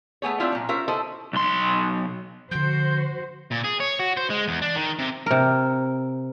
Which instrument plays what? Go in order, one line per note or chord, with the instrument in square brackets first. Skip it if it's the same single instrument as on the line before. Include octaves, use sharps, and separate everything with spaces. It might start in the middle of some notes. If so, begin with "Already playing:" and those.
[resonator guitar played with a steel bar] A3 B3 G#4 C#5
C4 D4 E4 F4
A#2 F#3
C#4 F4 A#4 C5 E5
E4 A4 C5 D#5
[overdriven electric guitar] B1 C6
[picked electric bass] D3 F3 [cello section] F#4 C5 [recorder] G6
[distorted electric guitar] A#2
G#4
C#5
F#4
C5
G#3
E2
D4
D#3
C3
[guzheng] C3 A#4